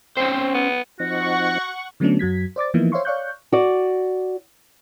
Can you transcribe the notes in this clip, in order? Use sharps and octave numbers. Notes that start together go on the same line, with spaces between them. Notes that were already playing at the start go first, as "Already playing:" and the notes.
C4 C#4 C5
B3
F3 C4 D#4 F#4 F#5 C#6
D3 F#3 A3 B3 C#4 D4
F#2 F#3 G#6 B6
C5 D5 D6 A6
E3 F3 A#3 B3 D#4 E4
C5 C#5 E5 F5 C6 C#6
C#5 D5 F5 C#6 F#6 G6
F#4 D5